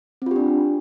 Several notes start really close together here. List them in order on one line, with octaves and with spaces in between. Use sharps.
C4 F4 G4 D4